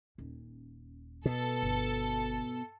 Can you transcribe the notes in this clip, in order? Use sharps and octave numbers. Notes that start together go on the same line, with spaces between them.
D#1 C#4
B2 A4
G1